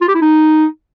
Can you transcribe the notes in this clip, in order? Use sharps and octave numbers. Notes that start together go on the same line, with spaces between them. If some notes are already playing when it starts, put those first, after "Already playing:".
F4
G4
E4
D#4